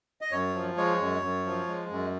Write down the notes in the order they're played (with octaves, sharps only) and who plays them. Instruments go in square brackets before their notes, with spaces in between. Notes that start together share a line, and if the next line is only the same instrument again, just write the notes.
[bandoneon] D#5
F#2 C#5
F3
G#3 C#5
F#2
F#2
F3
G#3
F#2